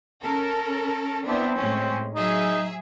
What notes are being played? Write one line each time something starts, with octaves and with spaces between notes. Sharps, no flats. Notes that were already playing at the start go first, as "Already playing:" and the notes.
C#4 A4 A#4
B3 C4 D4 E4
A2 G#3 C#4
F#3 D#4 G#4 E5